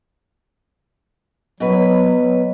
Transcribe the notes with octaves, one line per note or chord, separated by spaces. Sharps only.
B2 F#3 B4